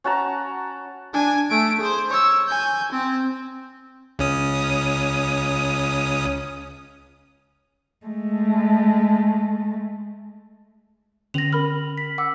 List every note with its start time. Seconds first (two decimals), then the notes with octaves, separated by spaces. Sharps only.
0.04 C#4 F#4 A5 A#5
1.13 D4 G#5
1.50 A3 D7
1.80 G#4 C5
2.10 C#5 E6
2.48 G#5 G6
2.92 C4
4.19 C#2 C#4 D#6
8.06 G#3 A3
11.34 D3 C#4 A#6 F7 F#7
11.53 A#4 B5 F6
11.98 B6
12.18 F#5 D6 E6